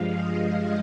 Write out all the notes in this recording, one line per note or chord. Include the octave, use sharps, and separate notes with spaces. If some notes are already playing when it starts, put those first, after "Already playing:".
Already playing: G2 F3 G#3 F5
D#5